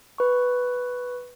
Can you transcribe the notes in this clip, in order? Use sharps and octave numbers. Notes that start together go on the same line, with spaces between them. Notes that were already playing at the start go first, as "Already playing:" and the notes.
B4 C#6